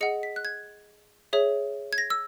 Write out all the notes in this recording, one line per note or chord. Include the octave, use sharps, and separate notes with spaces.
G#4 D#5 F#5 C#7
B6
F#6
G#6
G#4 C#5 E5
G#6
A#6
E6